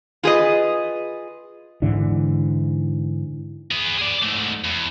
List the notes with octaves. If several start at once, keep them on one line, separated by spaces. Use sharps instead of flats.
F4 G#4 B4 D#5
G#2 D3 E3
B3 G#4
G#4 D5
G#2 A3
E2